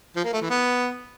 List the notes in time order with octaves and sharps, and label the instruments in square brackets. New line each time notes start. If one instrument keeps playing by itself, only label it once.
[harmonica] F3
A#3
A3
E3
B3